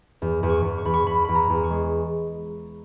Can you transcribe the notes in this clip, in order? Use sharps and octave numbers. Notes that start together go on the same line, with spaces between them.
E2
E2
C#6
E2
C#6
E2 B5
C#6
E2 B5
E2 B5
A#5
E2
C#6
G#3